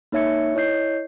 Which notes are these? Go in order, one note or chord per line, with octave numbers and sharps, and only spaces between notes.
A#3 D#4 C#5 E5 G#6 C#7
E4 C#5 D#5 G6 C7